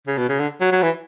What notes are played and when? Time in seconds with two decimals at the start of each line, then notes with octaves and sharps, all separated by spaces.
0.07 C#3
0.18 B2
0.29 C#3
0.40 D3
0.60 F#3
0.72 F#3
0.82 E3